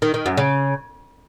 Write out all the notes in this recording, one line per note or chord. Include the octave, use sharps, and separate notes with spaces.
D#3
D#3
F#2
C#3